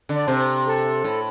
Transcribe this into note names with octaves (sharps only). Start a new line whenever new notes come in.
D3
D5
C3 C5
A4
A2